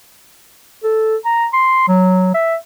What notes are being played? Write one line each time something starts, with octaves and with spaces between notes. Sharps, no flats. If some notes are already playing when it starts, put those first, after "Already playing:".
A4
A#5
C6
F#3
E5